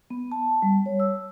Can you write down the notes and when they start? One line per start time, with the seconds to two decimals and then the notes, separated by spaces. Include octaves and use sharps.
0.10 B3
0.32 A5
0.62 G3
0.86 C#5
1.00 E6